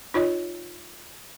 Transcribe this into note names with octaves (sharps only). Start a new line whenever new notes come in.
D#4 F4 C#5 D#5